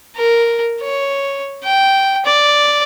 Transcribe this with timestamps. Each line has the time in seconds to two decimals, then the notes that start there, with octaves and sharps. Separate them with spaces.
0.17 A#4
0.81 C#5
1.64 G5
2.25 D5